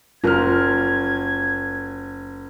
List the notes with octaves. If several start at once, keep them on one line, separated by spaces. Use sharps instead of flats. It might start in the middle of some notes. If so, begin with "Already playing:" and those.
F#1 F4 A#4 F6 G#6